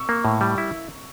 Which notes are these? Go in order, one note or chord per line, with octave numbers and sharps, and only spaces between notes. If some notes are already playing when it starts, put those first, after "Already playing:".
Already playing: C#6 E6
A#3
A2
G3
E4